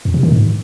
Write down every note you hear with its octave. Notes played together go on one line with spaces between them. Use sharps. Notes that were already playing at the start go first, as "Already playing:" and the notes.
F2
C3
D#3
G#2